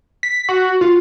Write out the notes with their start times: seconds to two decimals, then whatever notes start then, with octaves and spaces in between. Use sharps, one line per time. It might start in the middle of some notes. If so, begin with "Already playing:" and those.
0.23 B6
0.49 F#4
0.81 F4